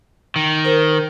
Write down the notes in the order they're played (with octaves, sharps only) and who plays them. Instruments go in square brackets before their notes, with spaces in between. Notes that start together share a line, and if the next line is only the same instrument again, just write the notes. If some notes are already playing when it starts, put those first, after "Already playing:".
[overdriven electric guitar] D#3
[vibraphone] A#4 C5